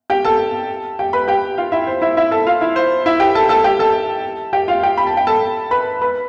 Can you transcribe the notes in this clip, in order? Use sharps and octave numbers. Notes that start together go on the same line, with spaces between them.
G4 G5
A4 A5
G4 G5
B4 B5
G4 G5
F4 F5
E4 E5
C5
E4 E5
E4 E5
A4 A5
F4 F5
E4 E5
C5
E4 E5
G4 G5
A4 A5
A4 A5
G4 G5
A4 A5
G4 G5
F4 F5
G4 G5
B5
A5
G5
A4 A5
B4 B5
B4 B5